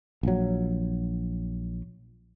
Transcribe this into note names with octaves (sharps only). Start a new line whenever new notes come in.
A#1 F#3